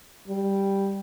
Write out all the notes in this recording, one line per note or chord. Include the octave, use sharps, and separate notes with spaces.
G3